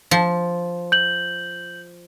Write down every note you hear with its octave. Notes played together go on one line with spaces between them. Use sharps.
F3
G6 F#7